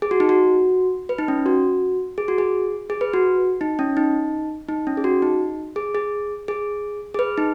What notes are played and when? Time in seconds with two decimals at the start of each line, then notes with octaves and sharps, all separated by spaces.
0.02 G#4
0.11 F#4
0.20 D#4
0.29 F#4
1.09 B4
1.18 D#4
1.28 C#4
1.46 F#4
2.18 G#4
2.28 F#4
2.38 G#4
2.90 G#4
3.01 B4
3.14 F#4
3.61 D#4
3.79 C#4
3.97 D#4
4.69 D#4
4.87 C#4
4.97 G#4
5.04 F#4
5.22 D#4
5.76 G#4
5.95 G#4
6.48 G#4
7.14 G#4
7.19 B4
7.38 D#4